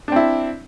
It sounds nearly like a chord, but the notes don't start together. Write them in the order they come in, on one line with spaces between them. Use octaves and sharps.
D4 C4 E4